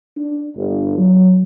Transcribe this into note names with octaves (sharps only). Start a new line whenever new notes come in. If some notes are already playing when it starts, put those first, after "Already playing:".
D4
G1
F#3